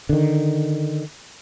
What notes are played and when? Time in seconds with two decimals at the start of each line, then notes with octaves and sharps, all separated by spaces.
0.09 D3 D#3